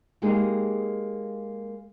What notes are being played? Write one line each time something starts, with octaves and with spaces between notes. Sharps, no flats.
G#3 A#3 D#4 G4 G#4